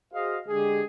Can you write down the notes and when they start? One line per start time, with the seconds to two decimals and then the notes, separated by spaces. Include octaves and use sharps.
0.13 F#4 G#4 C5 D#5 F5
0.47 D3 G#3 G4 G#4